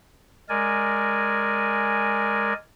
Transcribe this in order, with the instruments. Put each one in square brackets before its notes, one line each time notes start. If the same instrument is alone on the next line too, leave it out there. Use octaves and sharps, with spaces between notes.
[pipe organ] G#3 A#4 D5 G#5